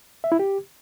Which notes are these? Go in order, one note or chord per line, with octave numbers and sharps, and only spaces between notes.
E5
E4
G4